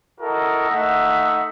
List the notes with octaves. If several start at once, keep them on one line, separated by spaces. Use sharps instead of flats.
E4 F#4 A4 A#4 D#5
A3 D#4 E5 F#5